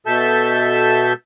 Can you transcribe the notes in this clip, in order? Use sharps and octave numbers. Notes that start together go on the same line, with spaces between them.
B2 A4 E5 A5 E6 G6